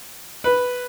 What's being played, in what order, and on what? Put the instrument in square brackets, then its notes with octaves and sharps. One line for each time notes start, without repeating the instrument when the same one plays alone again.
[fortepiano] B4